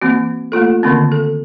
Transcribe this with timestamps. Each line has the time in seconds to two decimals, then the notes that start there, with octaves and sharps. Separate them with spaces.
0.02 E3 A#3 C4 F#4
0.52 A3 A#3 F4 A4
0.83 D3 D#3 A#3 C4 C#4
1.12 A4